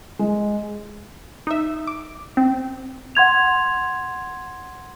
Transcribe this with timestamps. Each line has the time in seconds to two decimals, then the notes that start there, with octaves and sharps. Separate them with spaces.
0.19 G#3
1.47 D#4 E5
1.87 D6
2.37 C4
3.15 F#5 C6 G#6 F7